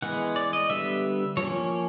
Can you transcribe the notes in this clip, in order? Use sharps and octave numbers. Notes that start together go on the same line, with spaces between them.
E3 G#3 B3 F#5
D5
D#5
D3 G3 B3 E5
F3 A#3 C#4 C#5